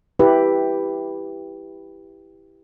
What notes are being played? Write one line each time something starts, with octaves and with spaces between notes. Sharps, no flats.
E4 G4 B4